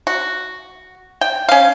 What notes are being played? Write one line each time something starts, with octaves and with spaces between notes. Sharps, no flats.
F#4
G5
C#4 F5